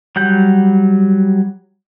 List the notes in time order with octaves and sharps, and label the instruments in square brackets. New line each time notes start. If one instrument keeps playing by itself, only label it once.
[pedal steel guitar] F#3 G3 F#5 G6